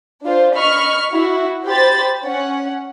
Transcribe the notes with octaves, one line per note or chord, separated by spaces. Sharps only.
D4 F4 C5
D#5 B5 C#6 F6
E4 F#4
G4 C5 B5 A6
C#4 F#5